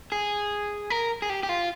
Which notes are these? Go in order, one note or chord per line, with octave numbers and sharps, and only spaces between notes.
G#4
A#4
G#4
G4
G4
F4